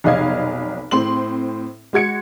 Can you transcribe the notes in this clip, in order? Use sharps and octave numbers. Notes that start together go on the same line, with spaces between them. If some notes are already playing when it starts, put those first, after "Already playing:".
F1 B1 D#5 F5 G#6
A2 C4 C6 F#7
G#3 F#4 G#6 C#7